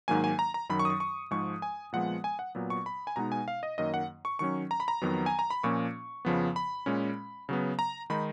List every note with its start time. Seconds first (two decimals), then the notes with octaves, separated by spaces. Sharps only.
0.08 G#2 D#3 F#3 A#3 G#5
0.24 G#5
0.39 A#5
0.54 A#5
0.69 F#2 D#3 F#3 B5
0.79 C#6
0.85 D#6
0.90 C#6
1.00 C#6
1.31 G#2 F3 G#3 C#6
1.62 G#5
1.93 A#2 F3 G#3 B3 F#5
2.24 G#5
2.39 F#5
2.55 A#2 F#3 B3
2.70 C#6
2.86 B5
3.07 G#5
3.16 B2 G#3 B3 D#4 A#5
3.32 G#5
3.48 F5
3.63 D#5
3.78 F#2 D#3 A#3 D#5
3.94 F#5
4.25 C#6
4.39 D#3 F#3 C#4 C#6
4.71 A#5
4.80 B5
4.88 A#5
5.02 F2 D#3 F#3 B3
5.26 G#5
5.39 A#5
5.50 B5
5.63 A#2 F3 A#3 C#4 C#6
6.25 F2 C#3 F3 B3
6.56 B5
6.86 A#2 G#3 C#4
7.49 C#3 F#3 B3
7.79 A#5
8.10 D#3 G#3 D#4 B5